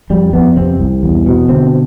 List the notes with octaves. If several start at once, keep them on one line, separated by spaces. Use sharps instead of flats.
F2 G3
F2 B3
C3 C4
C2
E2
B2
D3 C4